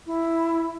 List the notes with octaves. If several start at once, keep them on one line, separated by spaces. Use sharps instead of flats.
E4